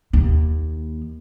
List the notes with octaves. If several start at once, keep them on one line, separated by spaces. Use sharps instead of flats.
D#2